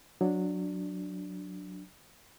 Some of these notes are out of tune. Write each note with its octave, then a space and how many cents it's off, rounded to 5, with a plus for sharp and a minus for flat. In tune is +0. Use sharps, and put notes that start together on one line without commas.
F#3 -10 D4 +0